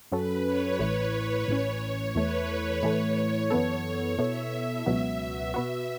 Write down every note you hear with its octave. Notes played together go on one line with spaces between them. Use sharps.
F#2 F#3 C#4 F#4 A4 B4
C#5
A1 A2 E3
A1 A2 E3 C#4
E2 E3 A3 B4
A2 E3 A3 C#5
F#2 E3 B3 A4
B2 B3 E4 A4 E5
C#2 B2 F#3 B3 F#4
B2 B3 F#4 E5